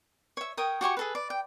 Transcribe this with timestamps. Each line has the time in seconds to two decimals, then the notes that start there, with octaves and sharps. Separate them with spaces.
0.37 C#5 E5
0.57 A#4 C#5 G5 D#6
0.81 F#4 G4 G#5 C#6
0.97 G#4 A4 B4
1.15 D5
1.30 G5